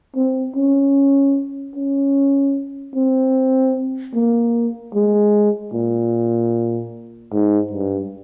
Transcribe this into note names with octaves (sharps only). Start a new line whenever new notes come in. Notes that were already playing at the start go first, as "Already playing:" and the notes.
C4
C#4
C#4
C4
A#3
G#3
A#2
G#2
G2